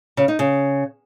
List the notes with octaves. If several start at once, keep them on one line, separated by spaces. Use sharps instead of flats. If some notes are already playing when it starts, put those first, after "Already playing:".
C#3
D#4
C#3